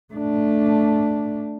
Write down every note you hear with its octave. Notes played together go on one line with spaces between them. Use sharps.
A3 D4